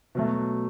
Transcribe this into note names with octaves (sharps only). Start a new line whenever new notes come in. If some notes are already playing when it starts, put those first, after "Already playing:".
B2 F#3 A3